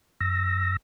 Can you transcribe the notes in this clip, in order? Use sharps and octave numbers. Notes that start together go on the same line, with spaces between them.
F#2 E6 A#6